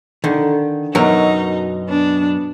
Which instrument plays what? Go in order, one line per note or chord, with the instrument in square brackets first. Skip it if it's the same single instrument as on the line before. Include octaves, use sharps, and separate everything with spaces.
[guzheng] D3 [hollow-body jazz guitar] D#3
[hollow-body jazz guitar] F#2 B2 A#4 [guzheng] F#3 [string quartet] D#4
[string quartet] B3 D4